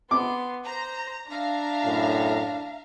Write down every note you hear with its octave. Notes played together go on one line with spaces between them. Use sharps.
B3 C6 D6
C5 A#5
D4 E5 F5 A#5
F#2 A2